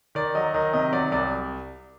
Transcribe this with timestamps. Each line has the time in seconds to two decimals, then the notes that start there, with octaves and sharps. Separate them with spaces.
0.15 D#3 D5
0.35 F#3 D#5
0.54 D#3 D#5
0.73 C3 D#5
0.92 F#3 D5
1.12 C2 D5